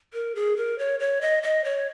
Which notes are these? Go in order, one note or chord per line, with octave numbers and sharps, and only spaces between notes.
A#4
G#4
A#4
C#5
C#5
D#5
D#5
C#5